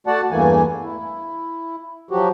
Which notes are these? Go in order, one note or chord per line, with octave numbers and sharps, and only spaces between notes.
A3 F#4 D5 F#5 A5
E2 G2 E3 A3 A#3 G#5
E4
F3 F#3 F#4 G4